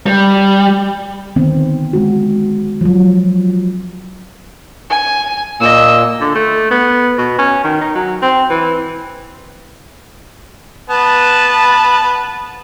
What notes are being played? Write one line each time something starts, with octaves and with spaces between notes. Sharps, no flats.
G3
D3 D#3 B3 C4
G#3 C4 F#4
F3 F#3
G#5
A#2 A#3 D#5 E6
D3
A3
B3
B2
C#4
D#3
D#4
F#3
C4
E3
B3 B4 A5